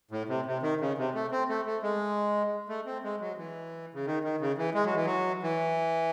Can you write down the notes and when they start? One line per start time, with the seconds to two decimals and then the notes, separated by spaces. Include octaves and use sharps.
0.11 A2
0.29 C3
0.46 C3
0.62 D#3
0.81 C#3
0.98 C3
1.14 A3
1.31 C4
1.49 A3
1.66 A3
1.83 G#3
2.69 A3
2.86 C4
3.04 G#3
3.21 F#3
3.38 E3
3.94 C#3
4.06 D#3
4.24 D#3
4.40 C#3
4.58 E3
4.75 G#3
4.85 F#3
4.96 E3
5.06 F#3
5.43 E3